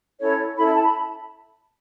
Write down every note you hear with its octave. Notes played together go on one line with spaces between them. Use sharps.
C#4 E4 A4 C#5
C#4 E4 A4 C#5 B5
E5
A5
B5